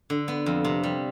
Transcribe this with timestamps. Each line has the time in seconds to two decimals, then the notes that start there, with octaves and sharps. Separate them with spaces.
0.10 D3
0.28 B3
0.46 F2
0.64 C3
0.83 G3